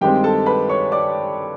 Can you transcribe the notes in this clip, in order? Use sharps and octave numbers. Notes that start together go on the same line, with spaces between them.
G2 D#3 G#3 C4 G4 G5
A4 A5
B4 B5
C#5 C#6
D5 D6